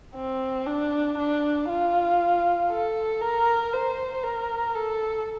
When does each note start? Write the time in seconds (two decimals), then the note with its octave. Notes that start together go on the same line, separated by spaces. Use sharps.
0.15 C4
0.66 D4
1.17 D4
1.69 F4
2.71 A4
3.21 A#4
3.73 C5
4.23 A#4
4.75 A4